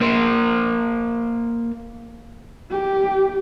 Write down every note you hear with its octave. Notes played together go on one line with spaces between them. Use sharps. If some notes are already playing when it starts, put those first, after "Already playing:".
A#3 C5
G4